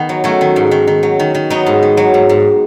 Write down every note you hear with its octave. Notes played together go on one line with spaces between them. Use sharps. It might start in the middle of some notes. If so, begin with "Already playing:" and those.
Already playing: D#3 B3
F#3
F#3 A3 C#4
D#3
G#2
D#3
D#3
F#3
D#3
D#3
F#3 B3 D#4
G#2
D#3
F#3
G#2
G#2